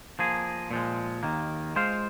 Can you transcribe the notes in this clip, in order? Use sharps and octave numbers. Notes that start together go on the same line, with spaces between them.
F3 A#3 G#4
A#2 F3 G#3
D#2 D#3 A#3
G#3 F4 C5 F5